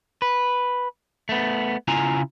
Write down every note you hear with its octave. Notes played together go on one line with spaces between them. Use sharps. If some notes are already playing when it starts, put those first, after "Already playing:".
B4
A3 B3
C#3 E4 F4 G#5 A#5